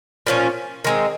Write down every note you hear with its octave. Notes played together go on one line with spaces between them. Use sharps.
A#2 F3 A3 C#4
D#3 G#3 C4